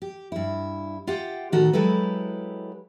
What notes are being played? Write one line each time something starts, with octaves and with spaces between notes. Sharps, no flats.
G4
G2 E4
F4 G4 E5 F#5 G5
A2 D#3 F#4 A4
F#3 G#3 E4 G4 A4 B4